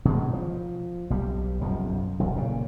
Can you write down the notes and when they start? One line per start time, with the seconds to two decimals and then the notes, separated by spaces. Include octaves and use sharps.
0.05 B2 D#3 G#3
0.33 F3
1.10 B1 G3
1.61 B1 F#2 C3 F3
2.20 E1 B1
2.36 A#2 C#3